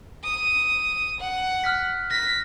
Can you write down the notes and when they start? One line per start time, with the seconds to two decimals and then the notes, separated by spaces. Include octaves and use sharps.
0.24 D#6
1.20 F#5
1.64 F6 F#6 B6
2.11 A#6 B6